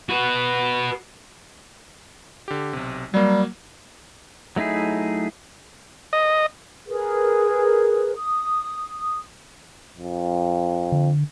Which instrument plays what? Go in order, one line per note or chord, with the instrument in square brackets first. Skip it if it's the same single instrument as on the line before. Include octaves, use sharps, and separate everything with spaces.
[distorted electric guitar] F#4 B4
[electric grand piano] D3 G4
B1 C3
[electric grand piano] F#3 A#3 [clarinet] G3
[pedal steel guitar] F#3 A3 D#4 E4 G#4
[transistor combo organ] D#5
[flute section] G#4 A#4 B4
D#6
[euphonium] F2
[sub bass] D3